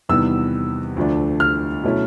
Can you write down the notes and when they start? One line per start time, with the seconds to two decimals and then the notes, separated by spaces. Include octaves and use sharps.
0.09 E2 C3 D#3 G3 B3 E6
0.97 D2 D3 F3 A3 D4
1.40 F6
1.83 B2 F#3 A3 C#4 E4